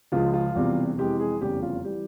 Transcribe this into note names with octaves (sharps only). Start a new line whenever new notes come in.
C#2 C#3 F3 G#3 F4
F4
E1 E2 C3 G3
F2 C3 E3 G#3 G4
G#4
F1 E2 C#3 G3 G4
F4
E3 G3 G4